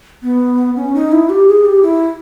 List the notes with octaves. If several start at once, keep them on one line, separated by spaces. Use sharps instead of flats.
B3
C#4
D#4
E4
G4
G#4
G4
E4